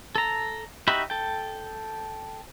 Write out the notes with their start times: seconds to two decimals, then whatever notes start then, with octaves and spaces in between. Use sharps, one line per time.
0.15 A4 A#5
0.88 D#4 F#4 G4 E5 B5
1.10 A4 G5